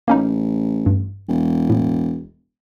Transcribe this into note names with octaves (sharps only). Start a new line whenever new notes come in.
A1 A#3 C#4 D#4
G2
E1
A2